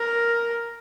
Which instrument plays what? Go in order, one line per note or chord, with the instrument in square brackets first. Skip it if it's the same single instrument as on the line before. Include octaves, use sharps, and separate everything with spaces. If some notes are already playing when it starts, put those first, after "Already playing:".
Already playing: [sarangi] A#4